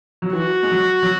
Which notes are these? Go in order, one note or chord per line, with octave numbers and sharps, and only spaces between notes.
F#3
E3 F#4
G#3
F#3
F#3